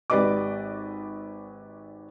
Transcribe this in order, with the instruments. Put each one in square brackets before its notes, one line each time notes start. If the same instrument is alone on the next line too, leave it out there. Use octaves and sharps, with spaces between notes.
[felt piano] G#1 G4 B4 D5 D#5 D6